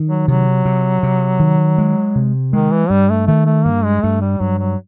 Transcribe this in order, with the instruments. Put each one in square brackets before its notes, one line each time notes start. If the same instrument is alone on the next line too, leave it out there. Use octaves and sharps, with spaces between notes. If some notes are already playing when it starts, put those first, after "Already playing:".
Already playing: [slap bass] D#3
[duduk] F#3
[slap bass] C3 [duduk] F#3
[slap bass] C3
C3
D#3
G#3
C3
[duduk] D#3 [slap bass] G#3
[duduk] E3
[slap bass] G2 [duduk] G3
[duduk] A3
[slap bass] D#3 [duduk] A3
[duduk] A3
[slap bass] G2 [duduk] A#3
[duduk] G#3
[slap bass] G2 [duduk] A3
[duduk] G3
[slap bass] G2 [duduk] F#3
[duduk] F#3